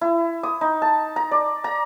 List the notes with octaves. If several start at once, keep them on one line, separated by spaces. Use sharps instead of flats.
E4
D#6
D#4
A5
A#5
D5
A#5